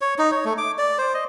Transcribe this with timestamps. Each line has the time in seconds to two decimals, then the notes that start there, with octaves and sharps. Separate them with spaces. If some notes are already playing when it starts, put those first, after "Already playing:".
0.01 C#5
0.18 D#4
0.32 C#5
0.45 A3
0.58 D6
0.78 D5
0.98 C5
1.14 D#5